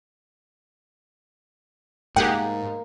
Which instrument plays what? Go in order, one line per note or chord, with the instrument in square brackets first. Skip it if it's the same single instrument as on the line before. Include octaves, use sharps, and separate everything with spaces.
[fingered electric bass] G#2 [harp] A#3 [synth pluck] G4 G#4 F#5 [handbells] G5